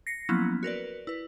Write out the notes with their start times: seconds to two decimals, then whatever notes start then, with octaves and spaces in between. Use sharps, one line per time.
0.07 A#6 C7 C#7
0.29 F3 F#3 A#3 B3 C#4 E4
0.63 F#4 A#4 B4 D5
1.07 E4 B4